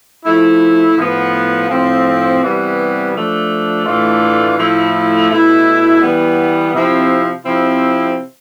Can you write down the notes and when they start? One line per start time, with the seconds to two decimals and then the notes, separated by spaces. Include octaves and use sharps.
0.25 F3 A3 E4
0.97 A2 F3 B3
1.69 A2 F3 C4
2.41 C3 E3 G3 B3
3.13 F3 A3 D4
3.85 A2 E3 A3 D4 F4
4.57 A2 F3 A3 E4
5.30 B2 A3 E4
6.01 E3 G3 B3
6.74 C3 F3 C4 E4
7.45 C3 F3 C4 E4